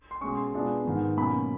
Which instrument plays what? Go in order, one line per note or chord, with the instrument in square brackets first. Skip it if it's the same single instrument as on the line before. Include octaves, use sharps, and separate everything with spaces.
[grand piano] C6
B2 G#3 C#4 C#6
C6
B2 G#3 B3 D4 F4
G#2 D#3 G#3 B3
B2 F#3 A#3 C#4 B5